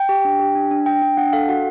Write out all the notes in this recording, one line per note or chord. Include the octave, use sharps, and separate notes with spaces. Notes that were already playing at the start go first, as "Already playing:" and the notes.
Already playing: G5
G4
D4
G4
D4
D4
D4 G5
D4 G5
D4 F#5
A4 F5
F#4 F#5